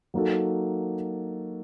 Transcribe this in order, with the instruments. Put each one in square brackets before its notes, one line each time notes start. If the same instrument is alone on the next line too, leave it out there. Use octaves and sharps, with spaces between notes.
[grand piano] F#3 A#3 D#4 F#4 A4